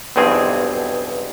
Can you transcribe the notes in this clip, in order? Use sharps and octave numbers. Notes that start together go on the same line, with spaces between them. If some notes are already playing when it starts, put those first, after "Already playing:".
B1 E2 G2 B2 C4 G#4